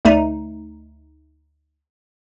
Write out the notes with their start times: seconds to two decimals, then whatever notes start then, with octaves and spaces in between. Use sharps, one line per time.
0.05 D2 A3 D#4